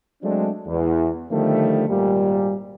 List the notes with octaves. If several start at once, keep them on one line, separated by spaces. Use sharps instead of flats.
F#3 G#3 A3 C4 D4
E2
D3 D#3 F3 G3 A3
G#1 A#2 G3